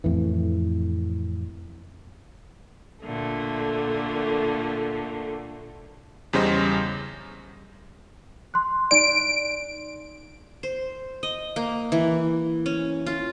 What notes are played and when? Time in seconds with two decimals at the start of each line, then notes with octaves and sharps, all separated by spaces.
0.04 F2 A2 E3
3.02 A#2 D3 A3
6.33 E2 C#3 G3 C5 D#5
8.54 C6 F#6
8.91 D#4 D5 D7
10.63 C5
11.23 D#5
11.56 A#3
11.92 E3
12.66 C#4
13.07 F4